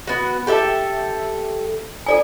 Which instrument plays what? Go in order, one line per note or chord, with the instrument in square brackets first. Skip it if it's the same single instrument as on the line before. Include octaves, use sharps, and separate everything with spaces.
[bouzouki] B3 F#4
G4 A4 E5
[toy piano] A4 D5 G#5